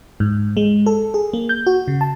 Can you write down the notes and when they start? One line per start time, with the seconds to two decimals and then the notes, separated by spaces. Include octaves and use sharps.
0.20 G#2
0.57 G#3
0.86 A4
1.14 G#4
1.33 A#3
1.49 G6
1.67 F#4
1.88 C#3
2.01 A5